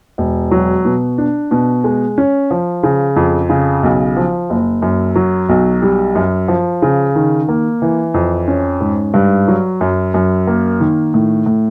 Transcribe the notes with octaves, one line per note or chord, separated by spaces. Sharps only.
E1
F#3
B2
D4
B2
G#3
C#4
F3
C#3
F2
C#3
B1
F3
F#1
F#2
F#3
B1
G3
F#2
F3
C#3
D#3
A#3
E3
F2
C#4
G#2
G2
F#3
F#2
F#2
A#3
D#3
A2
A2